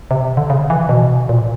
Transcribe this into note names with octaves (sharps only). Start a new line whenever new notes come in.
C3
D3
C#3
E3
B2
A#2